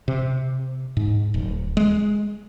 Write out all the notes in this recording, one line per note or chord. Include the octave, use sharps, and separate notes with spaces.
C3
G#2
D1
G#3